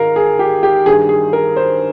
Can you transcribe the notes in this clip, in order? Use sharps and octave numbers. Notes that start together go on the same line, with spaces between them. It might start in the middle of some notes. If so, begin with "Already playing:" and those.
Already playing: G#2 D#3 A#4 F5
G#4
G4
G4
G2 D#3 G3 G#4
G#4
A#4
C5